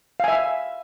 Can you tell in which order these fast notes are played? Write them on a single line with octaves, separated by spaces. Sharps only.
F5 G#5 E5